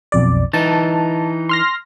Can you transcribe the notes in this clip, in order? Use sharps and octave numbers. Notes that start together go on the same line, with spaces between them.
B1 F2 D5
E3 D#4 A5
C6 F6 A#6